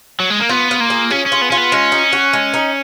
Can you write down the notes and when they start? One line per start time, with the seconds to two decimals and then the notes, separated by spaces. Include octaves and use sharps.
0.20 F#3
0.30 G#3
0.40 A#3
0.49 B3 F4
0.71 F4
0.80 A#3
0.90 G#4
1.11 C#4 G#4
1.26 C#4
1.32 F4
1.42 B3
1.51 C#4 F4
1.57 B3
1.72 G#3 C#4
1.92 D#4
2.13 F#4
2.33 G#3
2.54 D#4